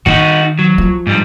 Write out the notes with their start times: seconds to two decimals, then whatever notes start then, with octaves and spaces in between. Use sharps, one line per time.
0.06 D#3 D#4 F#4
0.59 F#3
0.78 F3
1.07 G#2 G3